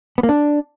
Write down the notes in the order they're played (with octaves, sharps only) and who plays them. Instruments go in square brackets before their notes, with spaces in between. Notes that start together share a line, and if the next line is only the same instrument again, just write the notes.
[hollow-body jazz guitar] B3
A#3
D4